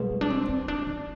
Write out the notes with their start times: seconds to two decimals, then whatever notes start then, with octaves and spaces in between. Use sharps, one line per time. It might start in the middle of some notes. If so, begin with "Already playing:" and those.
Already playing: C2 B2 G#3
0.11 B3
0.21 D4
0.30 C4
0.49 C4
0.68 D4
0.87 D4